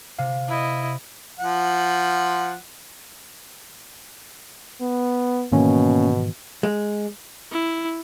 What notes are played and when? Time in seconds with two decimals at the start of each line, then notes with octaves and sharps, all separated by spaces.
0.18 C3 F5
0.49 E4 D#5
1.40 F3 F#5
4.81 B3
5.52 G#2 B2 D#3 E3 A#3 C#4
6.63 G#3
7.51 E4